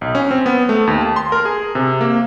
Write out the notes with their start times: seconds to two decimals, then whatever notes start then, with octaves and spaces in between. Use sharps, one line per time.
0.01 B1
0.15 C#4
0.31 C4
0.46 B3
0.69 A3
0.87 D#2
1.01 A5
1.16 C6
1.32 A#4
1.45 G#4
1.75 C3
2.01 A#3